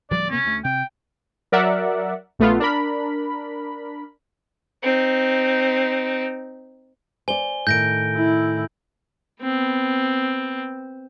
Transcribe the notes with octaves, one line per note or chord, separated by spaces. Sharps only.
D1 F3 G3 D5
C3 A#3 B3 C#4
D2 A3
C3 G5
F#3 A#4 D5 E5 F#5
A#1 A3 B3 F4
D4 A#4 B5
C4 D#4
C5 D5 G#5 G7
A2 D#3 G6 A#6 D7
E4
B3 C4